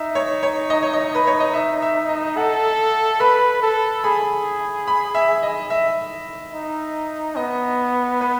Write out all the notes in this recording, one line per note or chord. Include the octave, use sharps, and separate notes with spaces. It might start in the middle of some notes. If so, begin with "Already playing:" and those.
Already playing: D#4 E5
C#5
C#5
D#5
C#5
D#5
B4
C#5
D#5
E5
E5
D#5
A4 F#5
B4 B5
A4
G#4 B5
B5
E5
D#5
E5
D#4
B3 D#5
B4